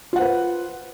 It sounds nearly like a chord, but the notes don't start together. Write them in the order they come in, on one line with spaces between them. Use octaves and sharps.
F4 F#5 C5 B4